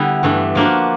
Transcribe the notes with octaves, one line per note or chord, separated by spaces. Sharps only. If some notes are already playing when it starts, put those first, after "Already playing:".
Already playing: D3 G3 B3 E4
G2 E3 A3 D4
F3 A#3 D4 F#4